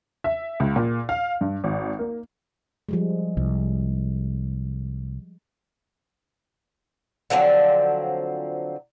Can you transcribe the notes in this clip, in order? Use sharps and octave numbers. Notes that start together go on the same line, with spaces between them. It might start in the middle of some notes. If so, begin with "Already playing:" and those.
E5
C#2
A#2
F5
G2
G#1
A#3
F3 G3 G#3
C2
D3 F3 F#3 C4